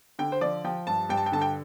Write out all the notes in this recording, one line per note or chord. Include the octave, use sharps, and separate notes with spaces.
D3 G5
C5
F3 D5
F3 G5
G2 A5
G2 G5
A5
G5
D3 A5
G5